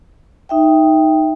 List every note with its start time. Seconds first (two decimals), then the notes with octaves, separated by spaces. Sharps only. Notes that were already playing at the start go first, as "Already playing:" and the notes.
0.49 D#4 E5 G5